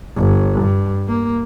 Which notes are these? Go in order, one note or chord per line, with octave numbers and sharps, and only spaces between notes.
G1
G2
A#3